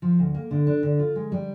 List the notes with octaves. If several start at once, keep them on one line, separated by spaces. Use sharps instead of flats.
F3
D2
A#3
D3
D4
D3
F4
G#3
G3